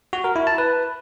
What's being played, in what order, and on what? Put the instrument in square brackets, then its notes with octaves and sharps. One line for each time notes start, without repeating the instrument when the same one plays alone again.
[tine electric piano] F#4
A#4
E4
A5
B4